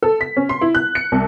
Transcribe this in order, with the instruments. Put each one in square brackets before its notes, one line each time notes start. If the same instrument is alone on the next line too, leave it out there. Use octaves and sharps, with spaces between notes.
[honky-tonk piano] A4
B6
C#4
C6
E4
F#6
C#7
C2